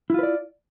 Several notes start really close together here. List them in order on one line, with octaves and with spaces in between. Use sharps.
E4 F4 B4 D5